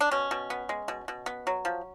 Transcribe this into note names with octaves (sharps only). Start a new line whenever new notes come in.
D4
B2 C#4
B2
B3
G#3
B2
B2
B3
F#3
F3